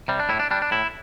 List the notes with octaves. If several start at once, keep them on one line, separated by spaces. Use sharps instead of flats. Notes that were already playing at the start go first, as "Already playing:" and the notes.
C3 G3
D4
A2 E4
D4
G3 D4
D4
A2 E4